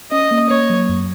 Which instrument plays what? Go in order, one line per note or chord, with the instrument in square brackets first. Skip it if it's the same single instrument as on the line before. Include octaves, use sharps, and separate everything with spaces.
[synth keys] C#4 [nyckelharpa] D#5
[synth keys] A#3
[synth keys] A#3 [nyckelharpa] C#5
[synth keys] F#3
F#2